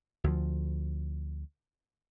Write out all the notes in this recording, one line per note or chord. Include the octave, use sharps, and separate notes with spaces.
D2 F3